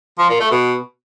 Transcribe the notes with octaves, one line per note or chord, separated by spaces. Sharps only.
F3
A#2
A3
B2